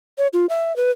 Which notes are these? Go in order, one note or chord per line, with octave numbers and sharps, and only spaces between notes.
C#5
F4
E5
B4